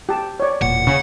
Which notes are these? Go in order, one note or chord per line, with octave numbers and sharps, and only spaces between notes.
G4 A5
C#5 D5
E1 A#2 F#5
C#3